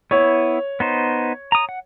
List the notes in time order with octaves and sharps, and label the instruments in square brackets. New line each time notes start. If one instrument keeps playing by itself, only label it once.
[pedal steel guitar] B3 E4 [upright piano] C#5
[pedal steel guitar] B3 D#4 C5
A#5 D#6
F#5